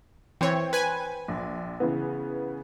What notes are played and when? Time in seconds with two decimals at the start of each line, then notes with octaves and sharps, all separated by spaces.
0.41 E3 C4 C5 C#5 G5
0.73 B4 G#5
1.28 A#1
1.80 C#3 E3 B3